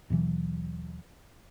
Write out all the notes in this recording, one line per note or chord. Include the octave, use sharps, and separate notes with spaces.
D#2 B2 E3 F#3